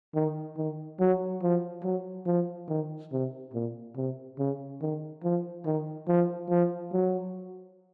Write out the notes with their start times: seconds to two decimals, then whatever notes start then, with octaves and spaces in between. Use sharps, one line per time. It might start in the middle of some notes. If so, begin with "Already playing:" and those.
0.15 D#3
0.57 D#3
1.00 F#3
1.42 F3
1.84 F#3
2.26 F3
2.69 D#3
3.12 C3
3.54 A#2
3.96 C3
4.39 C#3
4.81 D#3
5.23 F3
5.66 D#3
6.08 F3
6.50 F3
6.93 F#3